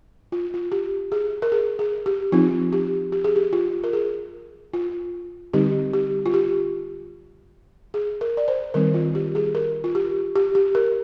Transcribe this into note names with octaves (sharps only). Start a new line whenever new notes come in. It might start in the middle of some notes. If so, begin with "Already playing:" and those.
F4
F4
G4
G#4
A#4
G#4
G#4
G4
F3 C4 D#4 F4
G4
G4
G#4
G4
F4
A#4
G#4
F4
D3 G3 C4 D#4 G4
G4
F4
G4
G#4
A#4
D5
C5
D#3 G3 C4 D#4 A#4
F4
G4
G#4
A#4
F4
G4
G4
G4
A#4